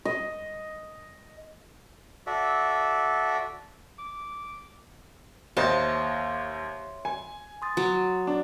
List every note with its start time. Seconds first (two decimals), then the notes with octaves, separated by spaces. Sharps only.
0.05 D#5
2.27 F#4 A4 D5 E5
3.98 D6
5.57 D#2 C5 C#5 D#5 E5 A5 C6
7.05 G#5
7.62 C6 D#6 A6
7.77 F#3
8.27 D4